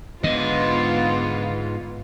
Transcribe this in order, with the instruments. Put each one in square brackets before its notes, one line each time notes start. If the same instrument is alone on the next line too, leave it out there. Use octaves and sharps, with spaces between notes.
[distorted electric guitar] G#2 D#5 [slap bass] D3 [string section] B3 F4